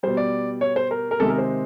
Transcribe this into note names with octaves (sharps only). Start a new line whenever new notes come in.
B2 G3 C5
D5
C#5
C5
A#4
A#4
C3 D#3 G#3 A4
A#4
C5